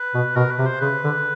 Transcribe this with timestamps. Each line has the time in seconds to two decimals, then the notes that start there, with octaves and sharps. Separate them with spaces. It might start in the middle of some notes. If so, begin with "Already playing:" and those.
Already playing: B4
0.14 B2
0.36 B2 A#4
0.51 B4
0.58 C3
0.66 C5
0.81 C#3 B4
1.04 D3